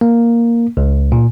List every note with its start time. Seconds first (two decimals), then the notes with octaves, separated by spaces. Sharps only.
0.01 A#3
0.77 C#2
1.12 A#2